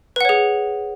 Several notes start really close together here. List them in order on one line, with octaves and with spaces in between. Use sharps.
B4 F#5 C#5 G#4